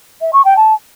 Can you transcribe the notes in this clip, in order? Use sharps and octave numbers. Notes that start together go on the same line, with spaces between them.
E5
C#6
G5
A5